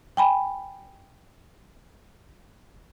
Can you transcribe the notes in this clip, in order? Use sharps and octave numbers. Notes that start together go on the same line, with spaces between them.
G5 G#5 B5